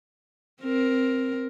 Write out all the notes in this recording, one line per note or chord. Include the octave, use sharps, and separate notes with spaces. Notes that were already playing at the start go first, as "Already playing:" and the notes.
C4 A#4